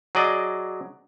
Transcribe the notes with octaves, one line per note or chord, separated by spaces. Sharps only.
F#3 G#4 D5 D#5